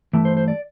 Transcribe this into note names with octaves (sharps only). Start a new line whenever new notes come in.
G2 E3 A3
C5
C5
D5